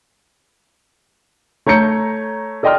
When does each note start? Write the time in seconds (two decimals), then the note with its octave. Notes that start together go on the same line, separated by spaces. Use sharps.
1.66 A3 C#5 A#5 G6 C#7
2.63 A4 D5 D#5 G5 C6 F6